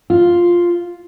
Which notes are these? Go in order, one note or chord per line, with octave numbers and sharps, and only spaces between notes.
F4